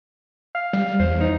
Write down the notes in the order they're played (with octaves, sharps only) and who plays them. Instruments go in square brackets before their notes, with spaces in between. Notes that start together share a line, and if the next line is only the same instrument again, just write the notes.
[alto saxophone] F5
[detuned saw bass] G3
[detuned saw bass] E2 [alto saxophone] C5
[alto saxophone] D#4